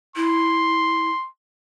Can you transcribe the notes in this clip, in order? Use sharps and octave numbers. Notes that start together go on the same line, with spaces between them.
E4 C6